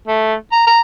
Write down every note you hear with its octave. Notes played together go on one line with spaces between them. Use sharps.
A3
A#5
A#5